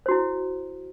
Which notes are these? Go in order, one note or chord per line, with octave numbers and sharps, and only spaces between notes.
E4 F#4 C5